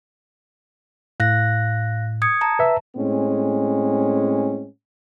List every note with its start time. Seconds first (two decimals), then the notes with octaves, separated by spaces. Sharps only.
1.20 A2 F5 F#6 A#6
2.22 D#6 G#6 C#7
2.41 A5 A#5
2.59 B4 E5
2.96 A2 G#3 C4 C#4